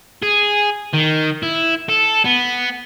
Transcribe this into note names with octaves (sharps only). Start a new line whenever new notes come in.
G#4
D#3
E4
A4
B3